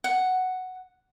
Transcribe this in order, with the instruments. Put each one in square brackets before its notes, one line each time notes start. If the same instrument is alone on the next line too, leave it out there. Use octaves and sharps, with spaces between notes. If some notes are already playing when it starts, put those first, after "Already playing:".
[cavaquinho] F#5